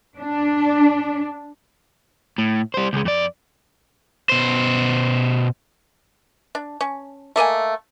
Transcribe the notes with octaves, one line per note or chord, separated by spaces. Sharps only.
D4
A2
G3 C5
C#2 G#3
F2 D5
B2 C5
D4
C#4
A3 A#3 D#5 G#5